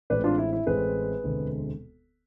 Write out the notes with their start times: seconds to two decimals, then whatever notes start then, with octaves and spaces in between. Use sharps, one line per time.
0.10 A1 A2 G#3 C4 B4 D5
0.24 D4 F4
0.38 E4
0.53 E4
0.66 A1 A2 G#3 C4 G#4 B4
1.23 E1 D2 D3 G#3 C4